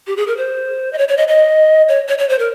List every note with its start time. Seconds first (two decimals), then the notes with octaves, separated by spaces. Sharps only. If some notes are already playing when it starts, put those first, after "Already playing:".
0.07 G4
0.17 G#4
0.27 A#4
0.37 C5
0.93 D#5
0.98 C#5
1.08 C#5
1.17 D#5
1.28 D#5
1.88 C#5
2.08 C#5
2.18 C#5
2.29 C5
2.39 A#4